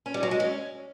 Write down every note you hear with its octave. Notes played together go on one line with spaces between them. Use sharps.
C#4
G3
F#3
G#3
C#4